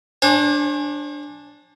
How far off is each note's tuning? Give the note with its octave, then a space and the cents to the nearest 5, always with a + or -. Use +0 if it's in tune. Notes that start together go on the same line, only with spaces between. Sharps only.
D4 +0 C5 +45 G#5 +0